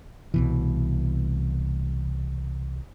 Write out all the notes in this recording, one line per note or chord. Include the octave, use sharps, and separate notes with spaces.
C2 B2 E3